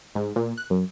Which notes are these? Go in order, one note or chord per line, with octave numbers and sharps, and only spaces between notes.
G#2
A#2
F#6
F#2